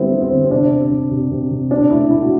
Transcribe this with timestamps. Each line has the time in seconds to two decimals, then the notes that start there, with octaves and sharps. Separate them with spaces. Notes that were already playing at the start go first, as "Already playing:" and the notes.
Already playing: D3 G3 B3 C4 E4
0.11 B3
0.21 C4
0.31 D3
0.44 C4
0.51 C3 D4
0.71 C3
0.91 C3
1.11 C3
1.31 C3
1.51 C3
1.71 B2 D4
1.91 A3 E4
2.11 A3 E4
2.22 F#4